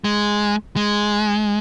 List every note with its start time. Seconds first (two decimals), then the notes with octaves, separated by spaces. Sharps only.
0.04 G#3
0.76 G#3